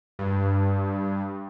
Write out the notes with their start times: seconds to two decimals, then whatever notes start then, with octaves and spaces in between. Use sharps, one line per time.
0.19 G2